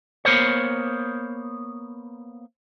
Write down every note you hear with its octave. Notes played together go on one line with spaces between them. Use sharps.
A#3 B3 A#4 C5 C#5